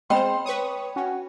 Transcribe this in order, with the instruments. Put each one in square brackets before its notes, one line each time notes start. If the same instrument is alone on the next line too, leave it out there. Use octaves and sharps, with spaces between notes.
[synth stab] G#3 C4 C5 [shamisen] B3 D#5 [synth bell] G5 B5 [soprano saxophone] C6
[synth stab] B4 C#6 D#6 [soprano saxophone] C#5
[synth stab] C#4 [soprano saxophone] F#4